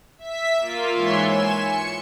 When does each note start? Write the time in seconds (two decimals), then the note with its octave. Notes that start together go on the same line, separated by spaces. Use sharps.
0.18 E5 B6
0.57 A#3 F4
0.92 G#2 E3 C#5 E5 C6
1.24 G#5 E7
1.60 C#7